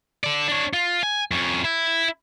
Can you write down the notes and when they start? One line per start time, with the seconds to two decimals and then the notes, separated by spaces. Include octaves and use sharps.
0.24 A4 D5
0.48 D4 C#5
0.73 F4
1.03 G#5
1.31 F2 C#4
1.64 E4